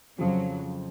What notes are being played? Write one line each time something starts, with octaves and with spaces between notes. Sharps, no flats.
F2 C#3 F3 F#3